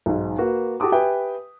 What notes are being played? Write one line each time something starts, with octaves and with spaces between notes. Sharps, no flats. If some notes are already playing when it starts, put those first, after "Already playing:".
B1 G#2
A#3 F#4 B4
F#4 G4 A4 D6 D#6
G4 B4 E5 G5 G#5